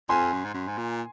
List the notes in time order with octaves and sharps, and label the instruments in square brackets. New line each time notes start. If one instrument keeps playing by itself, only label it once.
[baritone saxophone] F2 [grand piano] G#5 C6
[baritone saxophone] F#2
G#2
F#2
G#2
A#2